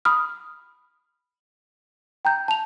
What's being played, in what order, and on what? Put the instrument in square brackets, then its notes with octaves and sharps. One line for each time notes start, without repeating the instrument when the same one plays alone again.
[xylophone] B5 D#6 F6
G5 A#5 G6
A5 F7